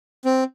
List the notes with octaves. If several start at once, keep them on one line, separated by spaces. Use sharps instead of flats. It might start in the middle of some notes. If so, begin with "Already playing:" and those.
C4